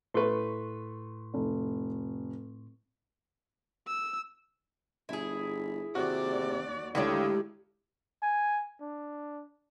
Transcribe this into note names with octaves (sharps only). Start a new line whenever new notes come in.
A2 A3 B4 C6 C#6
F1
E6
G1 E4 G#4
D#2 C3 F#4 D5
D#2 A2 D3 D#3 G#3 G4 C#5 D5
G#5
D4